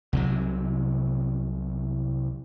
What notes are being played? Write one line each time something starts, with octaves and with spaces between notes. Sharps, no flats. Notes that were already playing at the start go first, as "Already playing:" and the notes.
C2 C3 F#3